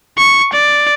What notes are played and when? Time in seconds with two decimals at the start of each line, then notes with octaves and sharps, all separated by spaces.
0.18 C#6
0.53 D5